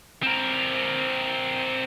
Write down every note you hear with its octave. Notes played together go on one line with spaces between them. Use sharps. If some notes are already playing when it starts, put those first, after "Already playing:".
C4 A#4